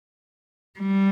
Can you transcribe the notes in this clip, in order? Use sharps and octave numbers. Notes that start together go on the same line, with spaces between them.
G3